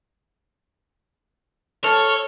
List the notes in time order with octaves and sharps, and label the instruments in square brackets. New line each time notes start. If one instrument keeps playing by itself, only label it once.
[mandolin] A4 F6 [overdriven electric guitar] C#5